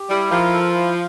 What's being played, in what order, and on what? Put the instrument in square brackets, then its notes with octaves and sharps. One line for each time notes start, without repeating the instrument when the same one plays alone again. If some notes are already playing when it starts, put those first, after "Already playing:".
Already playing: [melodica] G4
[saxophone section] G3 [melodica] E4
[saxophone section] F3 [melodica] A#4
[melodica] A4
E4